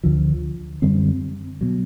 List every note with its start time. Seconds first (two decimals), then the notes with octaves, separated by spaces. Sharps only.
0.04 D2 D3 F3
0.82 F#2 D3 G3 C4
1.61 B2 F#3